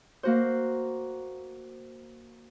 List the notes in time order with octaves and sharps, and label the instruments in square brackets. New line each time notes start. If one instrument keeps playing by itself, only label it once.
[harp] A#3 F#4 C5